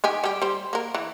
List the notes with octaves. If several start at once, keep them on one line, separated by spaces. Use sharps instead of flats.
D#3 G4 G#5
G3 G4
G3 C5
A#3 A#4
E3